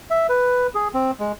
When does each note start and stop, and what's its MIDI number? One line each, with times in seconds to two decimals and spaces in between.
0.11 0.27 76
0.29 0.67 71
0.75 0.88 68
0.94 1.11 60
1.19 1.32 56